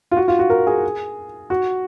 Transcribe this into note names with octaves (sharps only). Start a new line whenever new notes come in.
F4
F#4
F4
F#4
A#4
G#4
F#4